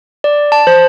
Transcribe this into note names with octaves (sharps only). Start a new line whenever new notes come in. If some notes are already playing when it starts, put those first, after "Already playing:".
D5
A5
C5